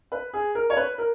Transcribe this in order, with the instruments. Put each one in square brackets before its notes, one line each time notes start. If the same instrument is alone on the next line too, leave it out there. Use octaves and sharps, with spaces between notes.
[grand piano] B4
G#4
A#4
C#5
B4
A#4